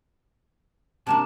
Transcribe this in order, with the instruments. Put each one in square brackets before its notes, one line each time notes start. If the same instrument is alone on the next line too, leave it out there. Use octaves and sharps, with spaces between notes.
[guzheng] C3 A#3 D4 [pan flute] A5